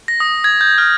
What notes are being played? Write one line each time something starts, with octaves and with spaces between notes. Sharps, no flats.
A#6
D#6
G#6
G6
F6